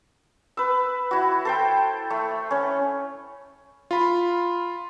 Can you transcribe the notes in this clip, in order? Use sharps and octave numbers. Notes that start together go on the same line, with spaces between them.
B4 E6
E4 F#4
A4 C5 G5
A3
C#4 C#5
F4 B5